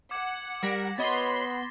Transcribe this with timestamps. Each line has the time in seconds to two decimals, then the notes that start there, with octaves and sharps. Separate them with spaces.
0.11 F#5 D6 G#6
0.63 G3 A#4 D6 A#6 B6
0.98 B3 F#4 C#5 D#5 B5 C6 A6 G7